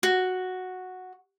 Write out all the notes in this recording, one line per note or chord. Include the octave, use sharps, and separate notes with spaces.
F#4